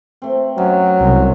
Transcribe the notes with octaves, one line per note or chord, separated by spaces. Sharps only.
A3 C4
F#2 F#3
C2